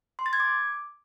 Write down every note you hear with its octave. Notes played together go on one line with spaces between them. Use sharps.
C6
A6
G#6
D6